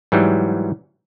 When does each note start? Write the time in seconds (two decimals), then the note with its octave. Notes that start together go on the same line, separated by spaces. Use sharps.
0.12 G#2 E3 F#3 G3